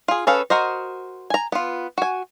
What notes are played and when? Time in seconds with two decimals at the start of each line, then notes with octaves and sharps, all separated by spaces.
0.08 F4 G#4
0.27 C#4 G#4 A4 B4 F5
0.50 F#4 A#4 C5 D#5
1.30 G#5 A#5
1.52 B3 F4
1.98 F#4 G#5